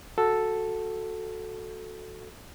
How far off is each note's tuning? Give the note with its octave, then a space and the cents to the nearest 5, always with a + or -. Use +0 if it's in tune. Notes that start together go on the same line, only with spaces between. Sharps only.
F#4 -5 A4 +0